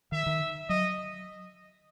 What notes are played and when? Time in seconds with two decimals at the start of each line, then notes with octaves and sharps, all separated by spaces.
0.12 D#3 E5
0.26 D#3
0.69 F#3 D#5